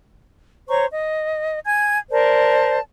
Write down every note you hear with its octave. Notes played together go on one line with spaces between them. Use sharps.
C5 C#5 A#5 C#6
D#5
G#5 G#6
A#4 C5 D5 A5